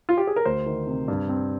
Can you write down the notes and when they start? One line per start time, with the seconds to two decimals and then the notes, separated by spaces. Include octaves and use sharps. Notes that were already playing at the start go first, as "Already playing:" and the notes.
0.09 F4
0.17 G4
0.27 G#4
0.36 A#4
0.45 D2 C5
0.66 D#3
0.87 C3
1.08 G2
1.29 C4